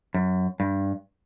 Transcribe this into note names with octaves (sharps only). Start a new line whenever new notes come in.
F#2
G2